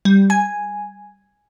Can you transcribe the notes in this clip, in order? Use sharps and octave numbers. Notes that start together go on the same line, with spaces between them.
G3
G#5